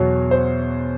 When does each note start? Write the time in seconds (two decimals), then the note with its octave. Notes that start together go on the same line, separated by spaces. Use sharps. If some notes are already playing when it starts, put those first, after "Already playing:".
Already playing: E2 B2 F#3 C#5
0.31 C5